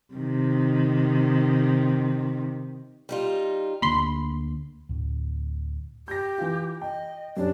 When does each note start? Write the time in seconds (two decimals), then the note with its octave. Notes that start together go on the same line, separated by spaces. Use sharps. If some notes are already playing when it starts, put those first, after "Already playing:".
0.14 C3 D#3
3.09 G3 D#4 F4
3.82 D2 D3 A#3 B5 C6
4.89 D2 A2
6.08 G4 G6 A#6
6.38 E3 F4
6.82 D#5 G5
7.37 F#2 G3 C#4 D4